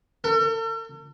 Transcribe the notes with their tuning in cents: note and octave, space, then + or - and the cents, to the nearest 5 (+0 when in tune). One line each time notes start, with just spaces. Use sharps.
A4 +45